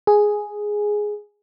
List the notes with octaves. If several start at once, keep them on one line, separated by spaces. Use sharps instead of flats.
G#4